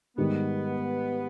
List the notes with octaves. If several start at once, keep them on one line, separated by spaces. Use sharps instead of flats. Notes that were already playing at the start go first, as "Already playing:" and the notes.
G#2 D#3 G3 B3